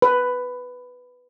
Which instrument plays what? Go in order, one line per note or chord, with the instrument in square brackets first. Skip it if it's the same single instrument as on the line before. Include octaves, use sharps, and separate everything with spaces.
[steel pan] B4